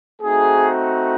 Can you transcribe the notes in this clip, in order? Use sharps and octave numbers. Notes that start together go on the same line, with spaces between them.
A3 C4 D#4 F#4 G#4